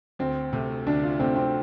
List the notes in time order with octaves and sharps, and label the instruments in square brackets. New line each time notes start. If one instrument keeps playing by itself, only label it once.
[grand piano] D2 [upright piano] C4
[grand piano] C3 A3
[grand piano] D2 [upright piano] D4
[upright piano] F4
[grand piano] C3 A3 [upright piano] C4
[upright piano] C4